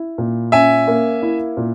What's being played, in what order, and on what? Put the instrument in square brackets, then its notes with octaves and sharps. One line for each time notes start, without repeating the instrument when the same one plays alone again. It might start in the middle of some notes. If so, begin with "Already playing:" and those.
Already playing: [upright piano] E4
A#2
[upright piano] C#4 [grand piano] E5 G#5
[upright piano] A#3
E4
A#2